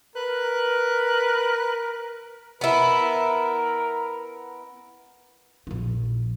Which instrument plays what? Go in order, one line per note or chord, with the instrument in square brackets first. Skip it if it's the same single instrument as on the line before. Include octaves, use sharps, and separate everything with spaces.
[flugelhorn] A#4 [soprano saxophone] B4
[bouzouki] B3 E4 [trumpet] A#4
[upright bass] A#1 E4